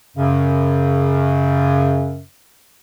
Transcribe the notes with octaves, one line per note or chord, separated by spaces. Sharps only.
F#2 C#3